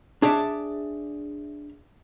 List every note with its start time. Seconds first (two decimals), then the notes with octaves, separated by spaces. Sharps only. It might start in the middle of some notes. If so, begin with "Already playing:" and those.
0.22 D4 G#4 C#5 D5 E5